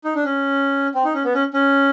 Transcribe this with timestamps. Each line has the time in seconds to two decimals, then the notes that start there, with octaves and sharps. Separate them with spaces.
0.05 D#4
0.15 D4
0.25 C#4
0.95 C4
1.04 D#4
1.14 C#4
1.24 B3
1.34 C#4
1.54 C#4